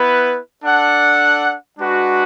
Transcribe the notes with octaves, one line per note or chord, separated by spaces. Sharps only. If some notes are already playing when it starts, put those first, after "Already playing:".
Already playing: B3 E4 B4
D4 A4 D5 F#5
G#3 D4 F#4 B4